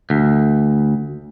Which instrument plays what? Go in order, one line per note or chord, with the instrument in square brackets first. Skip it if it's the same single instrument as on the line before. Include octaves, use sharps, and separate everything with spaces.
[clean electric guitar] D2